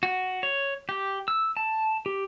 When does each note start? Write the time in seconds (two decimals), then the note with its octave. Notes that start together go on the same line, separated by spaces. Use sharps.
0.03 F#4
0.43 C#5
0.89 G4
1.28 E6
1.57 A5
2.06 G4